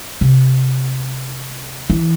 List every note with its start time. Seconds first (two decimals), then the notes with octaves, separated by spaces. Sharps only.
0.21 C3
1.90 E3